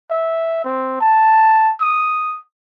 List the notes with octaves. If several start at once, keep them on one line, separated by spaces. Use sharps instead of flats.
E5
C4
A5
D#6